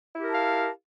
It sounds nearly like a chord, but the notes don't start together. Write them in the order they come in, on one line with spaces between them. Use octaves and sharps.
E4 G4 A#4 A5 F5